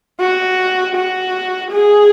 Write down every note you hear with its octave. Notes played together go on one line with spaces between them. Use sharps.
F#4
F#4
G#4